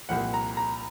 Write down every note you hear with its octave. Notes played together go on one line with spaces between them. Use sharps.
C2 A#2 F3 F#5
A#5
A#5